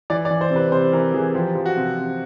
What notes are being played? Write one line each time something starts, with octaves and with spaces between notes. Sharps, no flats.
E3 D5
D5
E3
C5
C3
B4
C3 C5
E3 A#4
E3 G#4
F3 G4
F3
F#4
C3
C3